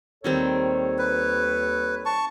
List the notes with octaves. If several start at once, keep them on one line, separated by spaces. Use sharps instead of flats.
D#2 D#3 G3 C4 A4 C#5
B4
A5 C#6